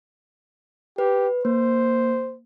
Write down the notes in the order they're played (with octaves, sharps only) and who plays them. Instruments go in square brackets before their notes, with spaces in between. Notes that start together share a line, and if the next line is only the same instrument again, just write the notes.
[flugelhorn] G4 [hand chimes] B4
[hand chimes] A#3 [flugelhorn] C5